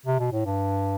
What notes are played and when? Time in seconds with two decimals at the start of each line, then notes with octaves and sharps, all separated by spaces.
0.06 C3
0.19 B2
0.32 A2
0.45 G2